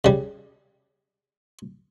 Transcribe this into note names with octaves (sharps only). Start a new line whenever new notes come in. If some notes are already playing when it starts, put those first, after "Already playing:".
C#3 G3